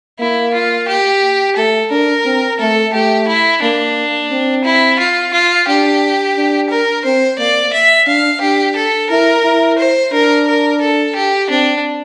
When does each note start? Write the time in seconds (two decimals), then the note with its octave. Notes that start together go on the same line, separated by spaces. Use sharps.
0.19 A#3 E4
0.54 F4
0.88 G4
1.56 A3 A4
1.91 D4 A#4
2.25 C4
2.60 A3 A4
2.93 A3 G4
3.28 E4
3.62 A#3 D4
4.31 C4
4.64 E4
4.99 F4
5.33 F4
5.67 D4 G4
6.36 D4
6.70 A#4
7.05 C4 C5
7.39 A#3 D5
7.73 E5
8.07 D4 F5
8.41 D4 G4
8.76 A4
9.10 E4 A#4
9.44 E4
9.78 C5
10.12 D4 A#4
10.47 A#4
10.81 A4
11.16 G4
11.50 C4 D4